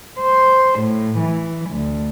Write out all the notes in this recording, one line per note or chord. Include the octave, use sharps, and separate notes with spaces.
C5
A2
E3
D2